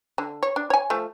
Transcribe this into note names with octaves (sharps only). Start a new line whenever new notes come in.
D3
C#5
D4
C#5 G#5
F3 A3